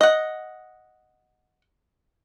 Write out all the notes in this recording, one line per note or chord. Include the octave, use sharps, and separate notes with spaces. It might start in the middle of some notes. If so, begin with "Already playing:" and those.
D#5 F#5